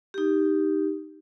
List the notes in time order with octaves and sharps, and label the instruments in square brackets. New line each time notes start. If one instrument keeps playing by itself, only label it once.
[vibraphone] D#4 G4